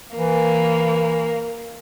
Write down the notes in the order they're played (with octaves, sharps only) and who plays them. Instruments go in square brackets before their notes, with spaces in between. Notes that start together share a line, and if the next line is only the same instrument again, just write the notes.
[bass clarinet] E3 [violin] A#3